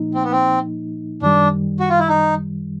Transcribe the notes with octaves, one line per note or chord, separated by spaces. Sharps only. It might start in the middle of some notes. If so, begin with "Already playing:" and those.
Already playing: A#2 F3 A#3 D#4
C4
B3
C4
F#2 D#3 G3 D4
F#4
F4
E4
D#4